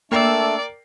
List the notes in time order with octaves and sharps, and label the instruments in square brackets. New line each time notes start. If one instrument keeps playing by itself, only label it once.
[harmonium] A3 D4 [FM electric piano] A#3 E6 [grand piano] A#4 G5 C7 [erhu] D5